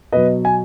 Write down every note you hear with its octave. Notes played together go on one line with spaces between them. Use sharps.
B2 F#3 B4 D#5
G#5